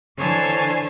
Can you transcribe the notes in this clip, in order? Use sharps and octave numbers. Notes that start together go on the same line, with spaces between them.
D3 E3 C5 C#5 G#5 A5